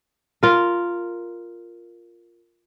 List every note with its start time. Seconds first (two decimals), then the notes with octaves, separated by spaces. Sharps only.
0.43 F4 A#4